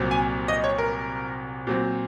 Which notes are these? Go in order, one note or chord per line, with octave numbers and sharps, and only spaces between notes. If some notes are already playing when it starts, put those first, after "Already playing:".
Already playing: C2 A#2 F#3 C4
G#5
D#5
C#5
A#4
A#2 F#3 C4